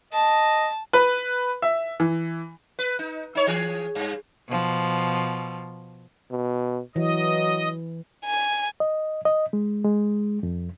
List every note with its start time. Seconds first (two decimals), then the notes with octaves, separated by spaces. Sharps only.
0.13 D#5 A5
0.93 B4
1.62 E5
2.00 E3
2.79 B4
2.99 D#4
3.35 D#4 C#5
3.47 E3 G#4
3.95 G2
4.48 B2 F3
6.31 B2
6.96 E3 F#3 D#5
8.25 G#5
8.80 D#5
9.25 D#5
9.53 G#3
9.85 G#3
10.43 F2